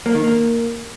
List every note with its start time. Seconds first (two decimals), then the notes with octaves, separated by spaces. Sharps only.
0.06 A#3
0.15 D#3
0.24 A#3